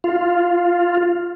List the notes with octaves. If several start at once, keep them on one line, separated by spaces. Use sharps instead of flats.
F4